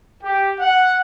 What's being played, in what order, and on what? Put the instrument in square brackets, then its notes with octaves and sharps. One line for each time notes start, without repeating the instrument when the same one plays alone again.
[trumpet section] G4
F#5